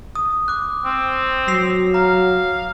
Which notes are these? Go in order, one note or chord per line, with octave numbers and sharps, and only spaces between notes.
D#6
D6 F#6
C4
F#3 A#6 C7 F7
F5 A#5